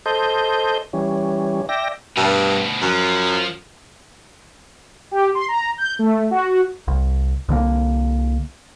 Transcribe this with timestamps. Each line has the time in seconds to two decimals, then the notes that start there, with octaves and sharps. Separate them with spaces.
0.06 A4 C5 D#5 G6
0.93 E3 G3 C#4
1.69 D5 E5 G5 A#6
2.17 D2 G2 B2
2.82 F#2 F3
5.11 G4
5.35 C6
5.48 A#5
5.78 G6
5.99 A3
6.31 F#4
6.88 C2
7.49 C2 D3 F3 A#3